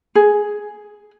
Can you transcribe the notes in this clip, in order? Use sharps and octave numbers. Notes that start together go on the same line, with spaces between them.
G#4